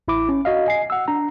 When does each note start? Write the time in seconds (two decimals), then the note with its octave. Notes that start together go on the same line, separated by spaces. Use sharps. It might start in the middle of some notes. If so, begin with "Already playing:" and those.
0.08 A1 E4 B5 D6
0.29 C#4
0.45 F#4 D#5 F5
0.66 D#5 G#5 C7
0.90 F#5 E6
1.08 D4 A#5